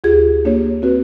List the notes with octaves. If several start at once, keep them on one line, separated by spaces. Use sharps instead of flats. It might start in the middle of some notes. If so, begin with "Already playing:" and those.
D2 F4 G4 G#4 G#6
A#3 D4 G4 C#5
C4 F#4 B4